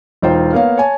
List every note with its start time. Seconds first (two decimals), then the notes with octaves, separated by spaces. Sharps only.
0.22 E1 D#4 F4 C5 G5
0.53 A#3 B3 C#5 F5
0.78 C#5 G#5 A5